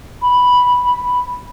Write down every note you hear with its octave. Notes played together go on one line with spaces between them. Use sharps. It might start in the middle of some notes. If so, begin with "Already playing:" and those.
B5